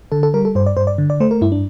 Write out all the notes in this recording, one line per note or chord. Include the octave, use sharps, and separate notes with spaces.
D3 A4
A4
G3 A#4
A4
G2 C5
D5
G2 C5
D5
D3
D5
A3 C5
A#4
G2 E4
D4